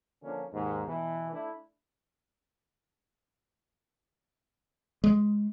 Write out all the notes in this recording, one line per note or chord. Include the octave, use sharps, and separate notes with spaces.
D3 F3 A#3 C#4 D4
D#2 G#2
B2 E3
A3 D4 E4
G#3